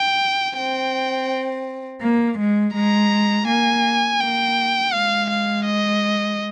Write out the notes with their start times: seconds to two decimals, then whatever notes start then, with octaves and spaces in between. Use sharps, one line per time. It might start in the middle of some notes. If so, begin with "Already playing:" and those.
Already playing: G5
0.57 C4 G5
2.02 A#3
2.39 G#3
2.75 G#3 A#5
3.48 A#3 G#5
4.20 A#3 G5
4.93 G#3 F5
5.29 F5
5.65 D#5